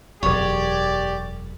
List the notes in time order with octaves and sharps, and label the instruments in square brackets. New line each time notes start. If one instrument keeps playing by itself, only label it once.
[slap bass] E1 F#2 [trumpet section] G4 D5 [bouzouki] C#5